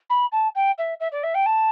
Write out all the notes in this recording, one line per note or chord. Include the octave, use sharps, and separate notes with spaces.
B5
A5
G5
E5
E5
D5
E5
G5
A5